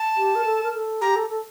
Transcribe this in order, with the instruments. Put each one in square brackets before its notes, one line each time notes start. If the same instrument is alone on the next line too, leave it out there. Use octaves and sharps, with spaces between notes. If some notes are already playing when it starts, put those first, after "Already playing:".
Already playing: [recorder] A5
[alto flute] G4
A#4
A4
A#4
A4
[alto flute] G4 [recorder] A#5
[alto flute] A4
A4